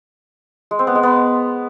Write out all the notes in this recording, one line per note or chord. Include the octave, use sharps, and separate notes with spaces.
G#3
C4
B3
G#3
B3